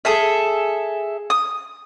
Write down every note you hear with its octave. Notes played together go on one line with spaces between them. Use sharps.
G#4 A4 E5
D#6